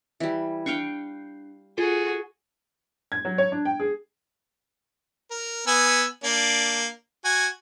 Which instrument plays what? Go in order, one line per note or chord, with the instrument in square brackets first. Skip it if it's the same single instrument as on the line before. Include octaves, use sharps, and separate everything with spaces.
[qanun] E3 G3
[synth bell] D4 [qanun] F5 G5 C#6
[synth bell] F4 A4 [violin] F#4 G#4
[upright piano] G#6
F#3
C#5
D4
G5
G#4
[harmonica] A#4
B3 G#5 E6
A#3 D4
F#4 G#5